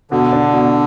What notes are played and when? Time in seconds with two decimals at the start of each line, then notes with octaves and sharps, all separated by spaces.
0.11 B2 D3
0.33 D4
0.53 B2